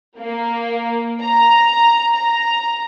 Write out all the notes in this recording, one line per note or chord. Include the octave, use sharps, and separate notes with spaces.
A#3
A#5
A#5